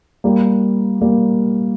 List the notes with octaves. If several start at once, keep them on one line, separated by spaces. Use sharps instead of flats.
G3 A#3
G3 A#3